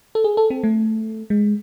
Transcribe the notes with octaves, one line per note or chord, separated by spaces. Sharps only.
A4
G#4
A4
C4
A3
G#3